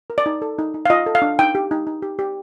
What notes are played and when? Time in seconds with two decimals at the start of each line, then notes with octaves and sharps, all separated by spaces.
0.10 A#4
0.18 D5
0.26 D#4
0.42 A4
0.59 D#4
0.74 D#4
0.86 F5
0.90 F4 D#5
1.06 A4
1.15 F5
1.22 D4
1.39 D#4 G5
1.55 G4
1.71 D#4
1.87 D#4
2.02 G4
2.19 G4